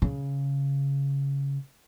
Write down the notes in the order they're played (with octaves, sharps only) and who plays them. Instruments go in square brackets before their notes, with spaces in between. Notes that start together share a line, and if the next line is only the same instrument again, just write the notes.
[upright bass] C#3